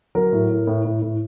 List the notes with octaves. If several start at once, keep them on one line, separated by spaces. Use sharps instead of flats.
F#3 A#4
A2
A2
A2
A2
A2